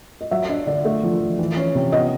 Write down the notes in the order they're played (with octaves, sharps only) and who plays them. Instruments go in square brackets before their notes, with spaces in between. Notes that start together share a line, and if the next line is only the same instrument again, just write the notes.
[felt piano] D#5
[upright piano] F#3 [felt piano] E5
[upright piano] D4 [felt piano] D#5
[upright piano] D3 [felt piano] D5
[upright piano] A3 [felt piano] D#5
[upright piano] F3
F3
E3
C#4
C3
[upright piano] B3 [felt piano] D#5